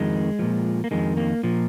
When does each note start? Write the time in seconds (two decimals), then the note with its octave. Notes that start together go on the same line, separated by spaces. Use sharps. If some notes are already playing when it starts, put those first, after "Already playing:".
Already playing: F2 D#3 G#3
0.39 A#2 F3
0.84 A#3
0.91 F2 D#3 G#3
1.17 A#3
1.43 A#2 F3